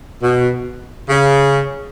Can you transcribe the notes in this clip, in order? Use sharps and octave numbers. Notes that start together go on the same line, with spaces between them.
B2
C#3